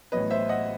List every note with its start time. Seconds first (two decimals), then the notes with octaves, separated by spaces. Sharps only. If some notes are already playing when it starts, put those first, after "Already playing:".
0.12 A1 A2 F#3 B3 B4 D#5
0.31 C5 E5
0.49 D#5 F#5